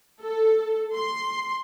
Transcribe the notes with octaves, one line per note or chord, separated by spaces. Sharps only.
A4
C6